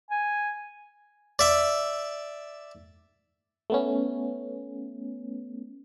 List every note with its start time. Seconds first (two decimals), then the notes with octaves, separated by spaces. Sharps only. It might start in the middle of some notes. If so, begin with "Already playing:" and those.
0.11 G#5
1.39 D5 E5
3.70 A3 B3 C#4